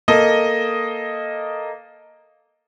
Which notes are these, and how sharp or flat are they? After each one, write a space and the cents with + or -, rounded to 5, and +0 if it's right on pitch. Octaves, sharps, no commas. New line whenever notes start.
A#3 +0 A4 +0 D#5 +0